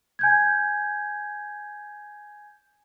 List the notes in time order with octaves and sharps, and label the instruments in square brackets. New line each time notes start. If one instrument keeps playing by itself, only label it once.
[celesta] G#5 G6 G#6